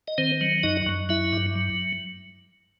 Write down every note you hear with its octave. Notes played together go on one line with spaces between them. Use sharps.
D#5
D#3 C4 C5
F#3
F#2 D#4 D#5
F#2
F#3 E4 E5
G2
F#3